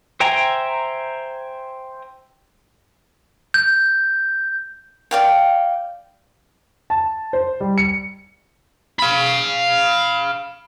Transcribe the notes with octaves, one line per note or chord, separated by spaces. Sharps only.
C5 E5 G5 G#5 A#5
G6
D5 F5 G5
A5
C5
G3
C#7
F5 B5